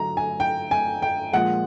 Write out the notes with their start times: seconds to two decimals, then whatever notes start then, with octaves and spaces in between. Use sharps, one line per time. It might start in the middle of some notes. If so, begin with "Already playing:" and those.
Already playing: D3 F#3 A#5
0.17 G#5
0.40 G5
0.71 G#5
1.02 G5
1.33 A#2 F3 G#3 F#5